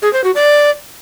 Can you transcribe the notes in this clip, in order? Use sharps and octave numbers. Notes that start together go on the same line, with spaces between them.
G#4
C5
F#4
D5